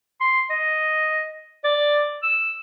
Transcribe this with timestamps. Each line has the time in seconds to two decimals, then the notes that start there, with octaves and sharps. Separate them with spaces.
0.21 C6
0.50 D#5
1.64 D5
2.23 E6